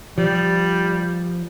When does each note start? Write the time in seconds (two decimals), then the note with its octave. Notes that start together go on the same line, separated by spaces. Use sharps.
0.18 F3 G3